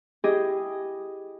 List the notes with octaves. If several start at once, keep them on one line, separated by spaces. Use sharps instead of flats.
E4 G4 G#4 D#5